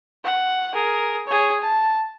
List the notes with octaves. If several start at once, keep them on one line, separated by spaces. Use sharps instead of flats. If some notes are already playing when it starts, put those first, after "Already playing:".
F#5
G#4 A#4
G#4 C#5
A5